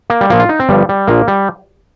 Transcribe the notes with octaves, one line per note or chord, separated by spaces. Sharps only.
A#3
G3
A#1 A#2 F3 A#3
F4
D#4
C4
G1 G2 F3 G3
G3
A#1 A#2 F3 A#3
G3